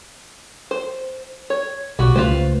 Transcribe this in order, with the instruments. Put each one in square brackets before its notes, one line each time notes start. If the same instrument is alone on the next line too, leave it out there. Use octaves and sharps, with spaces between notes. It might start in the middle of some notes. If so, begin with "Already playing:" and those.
[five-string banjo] C5
C#5
[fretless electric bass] B1 [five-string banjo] G3 F#4
[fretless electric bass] C#2 A3 [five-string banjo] F4 B4 C5